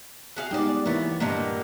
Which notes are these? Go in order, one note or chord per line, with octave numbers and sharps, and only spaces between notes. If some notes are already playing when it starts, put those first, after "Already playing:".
F#4 G#4 F5
G3 G#3 B3 D#4 G#4 D5 G5
E3 A#3 B3 E4 C#5 A6
G2 A#2 D3 D#3 A#3